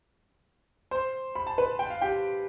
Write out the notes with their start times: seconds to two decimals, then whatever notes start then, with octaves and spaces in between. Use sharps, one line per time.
0.91 C5 C6
1.35 B5
1.47 A5
1.58 B4 B5
1.79 G5
1.90 F5
2.01 G4 G5